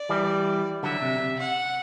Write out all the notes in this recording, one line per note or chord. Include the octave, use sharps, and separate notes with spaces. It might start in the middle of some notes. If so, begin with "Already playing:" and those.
Already playing: D5
E3 G3
D3 F#3 E5
C3
C3
F#5